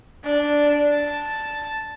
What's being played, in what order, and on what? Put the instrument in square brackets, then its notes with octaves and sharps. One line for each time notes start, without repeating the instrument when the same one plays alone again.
[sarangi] D4
A5